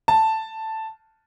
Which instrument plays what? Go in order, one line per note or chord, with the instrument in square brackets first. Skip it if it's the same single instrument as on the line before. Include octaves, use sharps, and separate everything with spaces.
[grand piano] A5